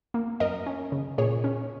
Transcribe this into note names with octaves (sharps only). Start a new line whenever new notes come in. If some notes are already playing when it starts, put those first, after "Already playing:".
A#3
F#2 A#4 D#5
C#4
C#3
A#2 G#4 C#5
C#4